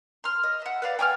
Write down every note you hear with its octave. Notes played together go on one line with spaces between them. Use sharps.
C6 F6
D#5
E5 F#5
B4 D5 F5
G5 G#5 D6 F6